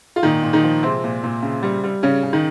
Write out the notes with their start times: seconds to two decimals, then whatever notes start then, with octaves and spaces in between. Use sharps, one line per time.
0.16 F4
0.23 A#2 D#3 D#4
0.43 A#2
0.53 D#3 D#4
0.63 F3
0.83 C3 G#3 C4
1.04 A#2
1.23 A#2
1.42 C#3
1.63 G3
1.83 G3
2.03 C#3 C#4
2.23 C#3
2.33 D#3 D#4